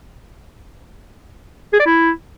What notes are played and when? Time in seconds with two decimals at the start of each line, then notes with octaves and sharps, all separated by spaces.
1.73 G#4
1.80 D5
1.86 E4